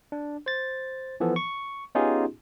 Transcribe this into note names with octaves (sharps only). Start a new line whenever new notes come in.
D4
C5 A6
E3 F3 B3 A4
C#6
B3 C#4 D#4 F4 G4 G#4